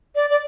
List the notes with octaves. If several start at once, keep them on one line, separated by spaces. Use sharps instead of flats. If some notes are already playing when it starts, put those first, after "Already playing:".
D5
D5